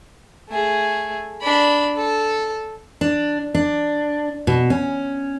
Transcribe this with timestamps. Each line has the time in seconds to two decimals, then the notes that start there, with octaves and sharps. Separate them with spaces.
0.48 A3 G#4
1.41 D4 B5
1.97 A4
3.01 D4
3.55 D4
4.47 B2
4.70 C#4